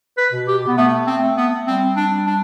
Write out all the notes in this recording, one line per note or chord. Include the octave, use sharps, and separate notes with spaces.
B4
B2
G4
B3
A3 B3
C4
A3
B3
G3 C4
D4
D4